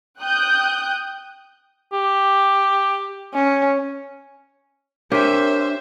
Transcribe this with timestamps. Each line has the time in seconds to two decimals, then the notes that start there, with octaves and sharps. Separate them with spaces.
0.20 G5 D#6 F#6 G6
1.93 G4
3.34 C#4
5.12 D4 G4 A#4 C5 C#5 E5 B6